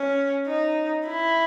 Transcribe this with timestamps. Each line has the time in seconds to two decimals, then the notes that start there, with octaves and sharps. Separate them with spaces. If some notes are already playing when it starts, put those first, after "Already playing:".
Already playing: C#4
0.47 D#4
1.07 E4